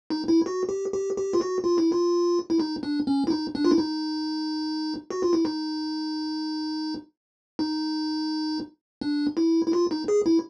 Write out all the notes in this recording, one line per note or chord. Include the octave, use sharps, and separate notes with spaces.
D#4
E4
F#4
G4
G4
G4
F4
F#4
F4
E4
F4
E4
D#4
D4
C#4
E4
D#4
D4
F4
E4
D#4
F#4
F4
E4
D#4
D#4
D4
E4
E4
F4
D#4
G#4
E4